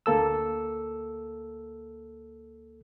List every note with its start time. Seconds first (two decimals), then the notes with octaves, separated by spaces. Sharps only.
0.06 D2 A#3 A4 E6